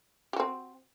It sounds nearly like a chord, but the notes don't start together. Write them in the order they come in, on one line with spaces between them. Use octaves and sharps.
G4 F#4 C4